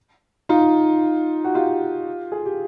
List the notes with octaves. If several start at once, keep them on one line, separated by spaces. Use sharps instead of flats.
D#4 F4
F#4
F4 G4
G#4
G4